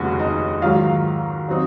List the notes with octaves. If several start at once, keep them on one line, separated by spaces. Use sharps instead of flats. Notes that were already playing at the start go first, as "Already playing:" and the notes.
Already playing: F1 D#2 C#3 F3 G#3 F#4
D#4 D#5
G#2 D#3 F#3 F4 F5
F#3 C4 D#4